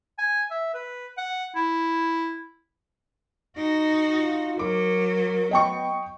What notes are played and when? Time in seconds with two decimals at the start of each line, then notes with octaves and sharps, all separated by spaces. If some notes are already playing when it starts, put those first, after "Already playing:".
0.18 G#5
0.51 E5
0.74 B4
1.17 F#5
1.55 E4
3.58 D#4 F#4
4.16 F4
4.59 F#3 A#4 D6
5.51 B3 D#5 G5 C#6